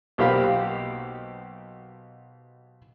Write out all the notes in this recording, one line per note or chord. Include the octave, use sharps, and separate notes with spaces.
B1 A#3 G4 C5 F5 B5